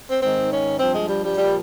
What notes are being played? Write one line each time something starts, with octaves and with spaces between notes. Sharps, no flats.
C4
G#2 D#3 C4
C#4
G2 F3 C4
G#3
G3
G3
A#2 F3 G3